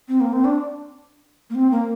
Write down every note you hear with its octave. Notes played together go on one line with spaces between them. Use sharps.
C4
A#3
C4
D4
A#3
C4
A#3